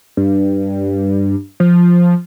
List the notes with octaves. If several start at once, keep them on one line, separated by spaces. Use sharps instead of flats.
G2
F3